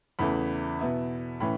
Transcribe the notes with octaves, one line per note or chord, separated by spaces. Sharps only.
E2 C#3 E3 A3 B5
B2 B3 E4
A2 E3 C#4 B5